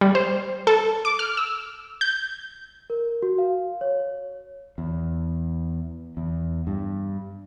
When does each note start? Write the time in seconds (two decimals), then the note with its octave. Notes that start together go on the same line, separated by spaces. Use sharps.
0.01 G3
0.15 C5
0.67 A4
1.05 D6
1.19 F6
1.37 E6
2.01 G6
2.90 A#4
3.22 F#4
3.38 F5
3.81 C#5
4.78 E2
6.17 E2
6.67 G2